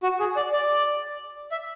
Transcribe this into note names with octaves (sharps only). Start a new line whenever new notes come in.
F#4
G#4
D5
D5
E5